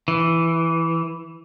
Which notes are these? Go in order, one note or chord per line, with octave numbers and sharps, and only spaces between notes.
E3